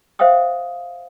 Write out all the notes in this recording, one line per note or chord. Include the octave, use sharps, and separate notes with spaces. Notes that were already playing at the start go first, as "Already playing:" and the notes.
C5 E5 F5 G5 D#6